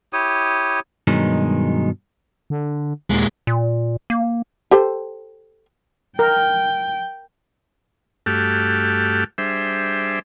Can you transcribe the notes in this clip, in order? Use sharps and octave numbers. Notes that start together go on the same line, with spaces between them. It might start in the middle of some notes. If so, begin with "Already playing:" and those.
E4 G4 C#5 D#6
G2 B2 D#3 F#3 G#3
D3
D#2 A#2 G#3
A#2
A#3
G4 A4 C5
A#4 G5
G2 A3 F#4 G4 A4 F6
G3 D4 G#4 C5 E5